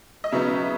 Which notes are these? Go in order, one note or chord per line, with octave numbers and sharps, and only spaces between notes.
D#5
C#3 F#3 B3 D#4 E5